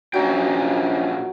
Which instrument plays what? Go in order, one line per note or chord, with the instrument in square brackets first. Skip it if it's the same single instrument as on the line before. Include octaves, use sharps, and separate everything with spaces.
[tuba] A#1 [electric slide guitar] A#2 C#4 G5 [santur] F#3